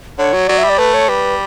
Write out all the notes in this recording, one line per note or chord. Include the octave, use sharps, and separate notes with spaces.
D3 C#5
F#3
F#3 D5
E5
G3
D5
A3 B4
C#5
G3 B4